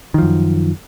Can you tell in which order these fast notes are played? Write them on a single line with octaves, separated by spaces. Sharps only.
D#3 F3 F#2